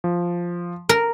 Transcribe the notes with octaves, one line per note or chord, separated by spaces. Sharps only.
F3
A#4